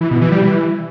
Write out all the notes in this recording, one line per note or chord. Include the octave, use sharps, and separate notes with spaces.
E3
B2
E3
G3
E3